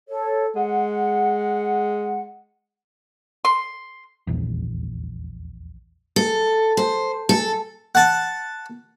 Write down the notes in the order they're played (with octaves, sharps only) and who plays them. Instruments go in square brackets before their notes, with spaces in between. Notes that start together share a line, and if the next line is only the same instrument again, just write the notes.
[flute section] A4 C#5
[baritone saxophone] G#3 [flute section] F#5
[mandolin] C6
[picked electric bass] D#1 A#1 E2
[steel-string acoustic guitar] A4
C5
A4
[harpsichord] F#5 A5